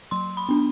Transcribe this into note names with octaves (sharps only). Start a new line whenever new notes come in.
F#3 C6
B5
B3 D4